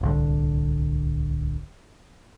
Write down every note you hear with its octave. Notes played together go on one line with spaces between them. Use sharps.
D1 C2 D3